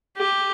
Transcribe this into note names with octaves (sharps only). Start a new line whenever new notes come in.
G4